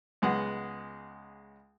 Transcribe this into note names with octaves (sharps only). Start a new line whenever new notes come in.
C#2 G#3 B3 F#5